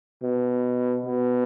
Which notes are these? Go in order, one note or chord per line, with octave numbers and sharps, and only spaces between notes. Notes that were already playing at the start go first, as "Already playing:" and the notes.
B2
B2